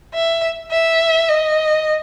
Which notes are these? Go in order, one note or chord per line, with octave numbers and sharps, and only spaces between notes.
E5
E5
D#5